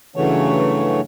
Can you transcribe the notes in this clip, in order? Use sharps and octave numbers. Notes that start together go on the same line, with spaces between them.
G2 C#3 E3 F#3 A3 C#5